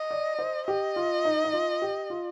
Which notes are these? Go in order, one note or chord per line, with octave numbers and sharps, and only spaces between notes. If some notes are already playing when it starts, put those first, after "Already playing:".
Already playing: D#5
D5
C5
G4 D#5
F4
D#4
D#4
F4
G4
F4